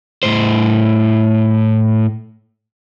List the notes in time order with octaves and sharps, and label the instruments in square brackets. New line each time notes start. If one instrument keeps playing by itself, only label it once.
[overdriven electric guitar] A2 C5